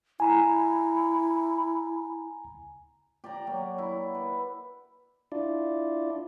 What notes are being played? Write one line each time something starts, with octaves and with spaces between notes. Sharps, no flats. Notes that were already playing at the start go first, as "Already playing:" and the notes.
E4 G#5 A#5
G4 D5 G5 A#5
F#3 A#3
E4
B4
D4 E4 F4 D5